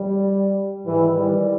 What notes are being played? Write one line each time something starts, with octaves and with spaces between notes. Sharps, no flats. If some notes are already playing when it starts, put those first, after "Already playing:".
Already playing: G3
G#2 D#3 E3
G3